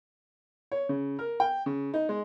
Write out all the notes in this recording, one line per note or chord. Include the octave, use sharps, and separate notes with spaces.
C#5
C#3
A#4
G5
C#3
D#4
G#3